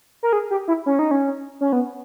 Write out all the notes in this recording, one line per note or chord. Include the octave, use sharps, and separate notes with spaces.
A#4
G#4
G4
E4
C#4
D#4
C#4
C#4
B3